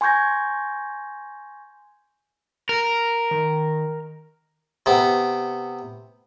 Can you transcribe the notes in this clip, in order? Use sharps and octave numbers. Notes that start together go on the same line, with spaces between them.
G#5 C6 C#6 G6 G#6 A#6
A#4
D#3
C3 B3